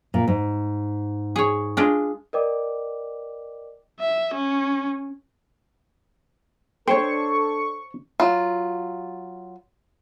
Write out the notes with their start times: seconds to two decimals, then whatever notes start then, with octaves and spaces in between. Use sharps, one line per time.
0.14 A#2
0.28 G#2
1.36 G#4 C#5
1.77 G#3 D4 F4
2.33 A#4 B4 D5 D#5 G5 D6
4.00 E5
4.33 C#4
6.88 D4 A4 C5 C#5 G5 C#6
8.20 F#3 F4